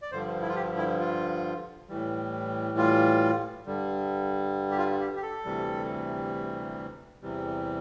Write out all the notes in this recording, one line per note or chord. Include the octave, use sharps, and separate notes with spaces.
D5
G2 D3 F3 C5
E4
F4
G4
E4
F4
A2 E3 G3
F4
G2 D3 G3
G4
F4
G4
G4
A4
D2 C3 E3 G3
E2 C3 E3 G3